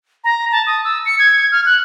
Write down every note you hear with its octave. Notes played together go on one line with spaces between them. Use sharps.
A#5
A5
D#6
E6
C#7
G#6
F6
F#6